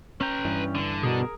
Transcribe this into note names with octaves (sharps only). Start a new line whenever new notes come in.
C#4 B4 G5 A#5
G2 E3
D3
B2 G#4 A#4